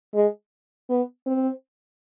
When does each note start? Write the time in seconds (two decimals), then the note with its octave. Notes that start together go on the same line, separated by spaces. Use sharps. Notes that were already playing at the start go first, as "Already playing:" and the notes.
0.15 G#3
0.90 B3
1.26 C4